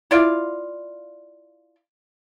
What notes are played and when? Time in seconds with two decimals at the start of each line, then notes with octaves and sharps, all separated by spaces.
0.11 E4 F4 D5 F5